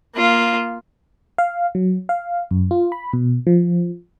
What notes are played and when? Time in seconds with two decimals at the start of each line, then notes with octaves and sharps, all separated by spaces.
0.15 A#3 F4
1.38 F5
1.75 F#3
2.09 F5
2.51 F#2
2.71 F4
2.92 B5
3.13 B2
3.47 F3